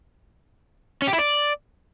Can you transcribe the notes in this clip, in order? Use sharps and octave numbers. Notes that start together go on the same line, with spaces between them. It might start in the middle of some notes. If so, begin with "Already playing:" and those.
C#4
G4
E4
D5